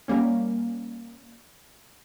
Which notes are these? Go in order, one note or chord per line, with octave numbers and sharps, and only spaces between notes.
G3 A#3 C#4